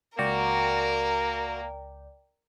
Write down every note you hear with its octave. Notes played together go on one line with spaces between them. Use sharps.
C#2 A#3 F#4 A#4 D5 G5